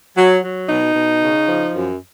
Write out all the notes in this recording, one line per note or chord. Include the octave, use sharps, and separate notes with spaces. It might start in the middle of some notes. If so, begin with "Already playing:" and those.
F#3
F#3
B2 D#4
B2
C#3
F3
F#2